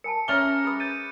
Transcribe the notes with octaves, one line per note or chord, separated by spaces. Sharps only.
A#4 G#5 A5 C#7
C#4 E5 A#5 D6 F6 A6 C#7 G7
G#4 B4 D#6
G6 A6 D#7